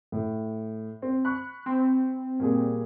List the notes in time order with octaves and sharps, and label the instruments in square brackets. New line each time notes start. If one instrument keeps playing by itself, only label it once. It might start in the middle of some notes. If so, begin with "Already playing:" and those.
[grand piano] A2
C4
[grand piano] B5 C#6 [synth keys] F#6
[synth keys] C4
[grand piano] A#2 G3 G#4